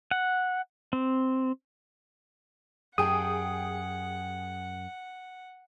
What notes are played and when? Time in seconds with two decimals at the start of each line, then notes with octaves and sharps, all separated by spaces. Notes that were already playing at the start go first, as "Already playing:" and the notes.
0.11 F#5
0.93 C4
2.98 F#2 G4 G#4 F#5 G5 A5 D#6